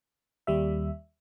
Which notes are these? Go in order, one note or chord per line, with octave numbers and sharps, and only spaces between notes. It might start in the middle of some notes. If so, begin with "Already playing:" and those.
D#2 G3 E5